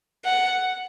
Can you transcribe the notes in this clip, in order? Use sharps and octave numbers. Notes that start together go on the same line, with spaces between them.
F#5